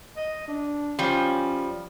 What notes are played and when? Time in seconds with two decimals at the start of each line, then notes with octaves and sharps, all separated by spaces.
0.16 D#5
0.48 D4
0.99 F3 G3 C#4